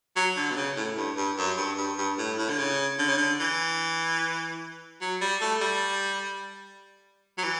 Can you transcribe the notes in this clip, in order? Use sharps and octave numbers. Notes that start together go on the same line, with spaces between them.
F#3
D3
B2
C#3
A2
G2
G2
F#2
G2
G2
G2
A2
A2
D3
C#3
D3
C#3
D3
E3
F#3
G3
A3
G3
F#3
E3